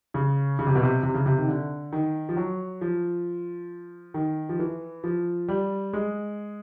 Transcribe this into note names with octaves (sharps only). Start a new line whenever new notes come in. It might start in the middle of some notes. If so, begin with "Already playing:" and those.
C#3
C#3
C3
B2
C3
C3
C#3
C3
D#3
D3
D#3
F3
F#3
F3
D#3
F3
E3
F3
G3
G#3